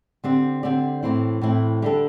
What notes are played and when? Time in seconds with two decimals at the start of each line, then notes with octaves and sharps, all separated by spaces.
0.24 D3 C4 G4 D5
0.63 D3 C4 G4 D5
1.03 A2 E3 C4 E4
1.41 A2 E3 C4 E4
1.82 D3 G3 D4 A4